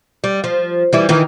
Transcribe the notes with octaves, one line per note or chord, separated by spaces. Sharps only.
G3
F3
E3 G3 E4
D#3 E3